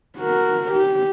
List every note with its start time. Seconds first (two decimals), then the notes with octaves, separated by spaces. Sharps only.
0.19 F#4 A#4
0.71 G4